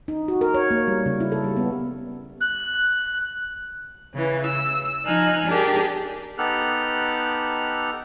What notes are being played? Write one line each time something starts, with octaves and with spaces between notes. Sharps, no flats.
D#4
F#4
A#4
C#5
A#3
G3
C#3
E4
A4
G3
B3
F#6
C#3 E3
E6
F3 D#4 G#5 F6 F#6
D4 G4 G#4 A#4
B3 D#4 G4 A4 F6 F#6